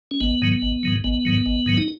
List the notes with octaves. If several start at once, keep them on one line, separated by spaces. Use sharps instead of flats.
C#4
G#1 B3
G#2 D#3 F#3
G#1
G#2 D#3 F#3
G#1 B3
G#2 D#3 F#3
G#1
G#2 D#3 F#3
D#4